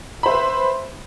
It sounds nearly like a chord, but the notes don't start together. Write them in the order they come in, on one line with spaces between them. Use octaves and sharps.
B5 C5 E5 B4